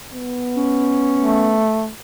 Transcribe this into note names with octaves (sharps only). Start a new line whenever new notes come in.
B3
C#4
A3